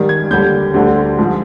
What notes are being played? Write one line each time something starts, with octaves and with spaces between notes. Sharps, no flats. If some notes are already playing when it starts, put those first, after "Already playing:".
Already playing: G#2 D#3 G3
G#6
D#2 D3 G3 G6
D2 D3 G3
G#2 F3